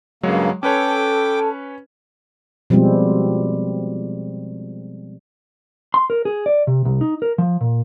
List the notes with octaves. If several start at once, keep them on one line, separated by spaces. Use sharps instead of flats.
G2 C#3 F#3 G#3 A#3 C#5
C#4 A4 B4 C#5 G5 A5 D6
B2 F3 G3 G#3 C4
C6
A#4
G#4
D5
C3
C2
D#4
A#4
F3
A#2